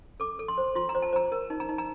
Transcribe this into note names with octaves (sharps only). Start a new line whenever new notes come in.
A4 D6
A4
C6
C5
F4 C6
A#5
C5
A5
C5 A#5
A#4
D#4
A#5
D#4
A#5